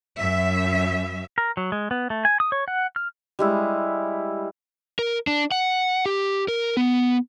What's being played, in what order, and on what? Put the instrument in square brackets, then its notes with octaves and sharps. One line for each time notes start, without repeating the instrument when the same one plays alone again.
[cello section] F#2 E5
[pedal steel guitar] A#4
F#3
G#3
B3
A3
G#5
D#6
C#5
F#5
F6
[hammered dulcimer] G3 G#3 E4
[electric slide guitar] A#4
D4
F#5
G4
A#4
B3